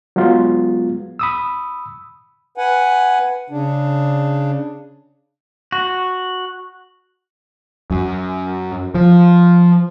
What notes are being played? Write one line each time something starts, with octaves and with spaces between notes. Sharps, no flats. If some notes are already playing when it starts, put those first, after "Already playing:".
F#3 G#3 B3 F4
B5 D#6 E6
B4 F#5 G#5
C#3 D4
F#4
F#2
F3